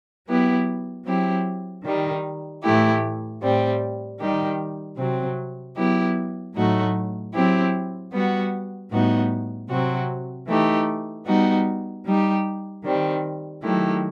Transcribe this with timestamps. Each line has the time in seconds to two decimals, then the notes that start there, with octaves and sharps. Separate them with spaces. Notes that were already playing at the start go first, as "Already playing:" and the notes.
0.26 F#3 B3 E4 G4
1.04 F#3 C4 E4 G4
1.83 D#3 G3 D#4
2.62 A2 E3 A3 E4 G4
3.41 A2 G3 C4
4.19 D#3 G3 D#4 G4
4.97 C3 F#3 C4
5.76 F#3 B3 E4 G4
6.55 A2 F#3 A3 D#4 F#4
7.33 F#3 C4 E4 G4
8.12 G3 B3 F#4
8.91 A2 G3 B3 D#4 F#4
9.69 C3 F#3 C4 F#4
10.47 E3 A3 D#4 G4
11.26 G3 B3 D#4 F#4
12.05 G3 D#4 G4
12.84 D#3 G3 C4
13.62 D#3 F#3 A3 E4 G4